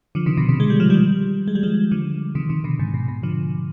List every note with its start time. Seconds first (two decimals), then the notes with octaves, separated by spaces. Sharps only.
0.15 D3 F3
0.26 C3 D#3
0.37 B2 D3
0.49 C3 D#3
0.60 G#3
0.70 G3
0.80 F3
0.90 D#3 G3
1.48 G#3
1.55 G3
1.63 F3 G#3
1.91 D3 F3
2.35 C3 D#3
2.49 C3 D#3
2.64 B2 D3
2.79 G#2 C3
2.94 B2
3.08 B2
3.23 D3 F3